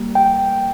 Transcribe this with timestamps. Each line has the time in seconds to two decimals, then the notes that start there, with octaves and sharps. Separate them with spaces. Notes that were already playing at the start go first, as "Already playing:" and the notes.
Already playing: G3 A#3
0.15 G5